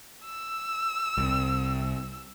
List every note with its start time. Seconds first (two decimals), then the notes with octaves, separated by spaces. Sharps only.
0.25 E6
1.18 C2